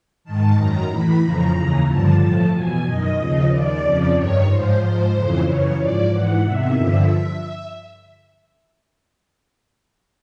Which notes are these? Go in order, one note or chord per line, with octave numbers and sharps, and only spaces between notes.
G#2 D#3 A5
F#2 D#3 A#5
A2 E3 B5
F2 C#3 F3 A#5
D#2 C#3 E3
G2 D3 F3 A5
A2 F3
E2 B2 G#5
F#2 D#3 D#5
D#2 C#3 F3
D#2 D#3 D5
F2 C#3 F3
G2 D#3 C#5
G#2 F3 C5
G#2 F3 C5
F2 C#3 E3
F#2 C#3 E3 C#5
G#2 F3 D5
G#2 E3 F#5
E2 C3 D#3 E5
G2 D3 F3